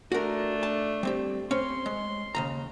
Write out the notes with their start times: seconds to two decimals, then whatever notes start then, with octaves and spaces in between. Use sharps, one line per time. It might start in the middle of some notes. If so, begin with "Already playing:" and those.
0.12 A3 D4 F#4 A#4
0.63 A5
1.03 G3 C4 G4
1.51 C4 C#4 C6
1.86 G#3
2.35 D#2 C#3 A#5